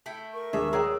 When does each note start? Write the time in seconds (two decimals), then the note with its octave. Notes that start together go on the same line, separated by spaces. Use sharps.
0.06 A3 E4 G5
0.34 A#4 C#6
0.53 D#1 G#3 D4 G#4 E5 E6
0.73 G#4 B4 C#5 D5 G5 A#5 D#6 E6